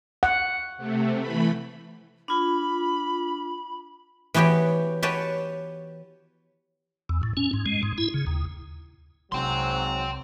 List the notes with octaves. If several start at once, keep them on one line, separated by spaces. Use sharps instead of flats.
F#5
C3 A3
E3 A3 B5
D4 F4 B5
E3 B3 F#4 G4 C#5
G4 B4 C#5 F#5 G#5 A5
E2
A2
C#4
G#2
G#3
G#2
E4
C#3
D#2
C2 G#2 F#3 A#3 G5 C6